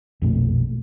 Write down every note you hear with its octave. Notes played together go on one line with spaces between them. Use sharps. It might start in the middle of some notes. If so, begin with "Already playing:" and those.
A#1 F2 B2 A3